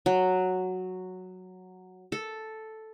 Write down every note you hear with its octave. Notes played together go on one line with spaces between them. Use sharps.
F#3
A4